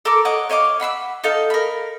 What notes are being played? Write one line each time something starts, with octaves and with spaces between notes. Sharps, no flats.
A4 A#4 A#5 D6
C#5 D#5 F#5 D6
C#5 D#5 F5 D6
F#5 B5 C6 E6
D#4 A4 F5
A#4 B5